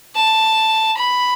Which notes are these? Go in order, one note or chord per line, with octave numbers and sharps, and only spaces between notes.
A5
B5